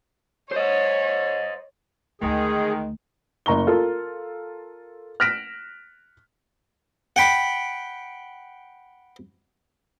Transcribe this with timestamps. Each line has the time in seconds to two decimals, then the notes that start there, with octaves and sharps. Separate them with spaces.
0.52 C5 C#5 D#5
2.22 D2 D#3 G#3 A3 G#4
3.46 F#1 A#5 C#6 G7
3.67 F4 A4 A#4
5.20 F6 F#6 A#6 B6 D7 E7
7.16 F#5 G5 B5